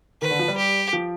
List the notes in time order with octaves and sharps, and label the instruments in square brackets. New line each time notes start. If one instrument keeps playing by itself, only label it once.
[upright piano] D#3 [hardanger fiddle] B4
[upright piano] D3
F3
G3
[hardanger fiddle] G4
[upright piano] F3